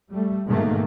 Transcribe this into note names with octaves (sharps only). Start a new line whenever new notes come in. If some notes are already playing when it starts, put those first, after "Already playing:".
G3 A3
G#2 B2 D#3 A3 A#3